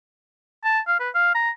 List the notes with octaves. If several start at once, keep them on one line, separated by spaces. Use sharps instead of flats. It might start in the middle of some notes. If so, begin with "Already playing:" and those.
A5
F5
B4
F5
A#5